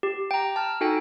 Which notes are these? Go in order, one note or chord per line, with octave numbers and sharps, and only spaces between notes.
G4
G5 A#5
A5 F6
D#4 F#4 A4 G5 G#5